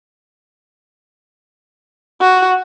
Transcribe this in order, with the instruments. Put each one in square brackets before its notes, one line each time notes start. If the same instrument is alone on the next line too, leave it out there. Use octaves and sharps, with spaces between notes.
[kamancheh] F#4